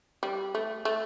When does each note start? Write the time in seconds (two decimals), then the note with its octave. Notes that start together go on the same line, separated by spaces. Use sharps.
0.23 G3
0.55 A3
0.85 A3